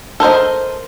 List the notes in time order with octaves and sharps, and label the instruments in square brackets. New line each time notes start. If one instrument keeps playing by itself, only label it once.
[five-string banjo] A4 A#4 C5 D#5